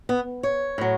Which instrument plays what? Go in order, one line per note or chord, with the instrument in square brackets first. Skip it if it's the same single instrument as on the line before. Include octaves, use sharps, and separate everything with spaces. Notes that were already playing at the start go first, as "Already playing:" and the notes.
[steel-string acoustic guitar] B3
C#5
A2 F#3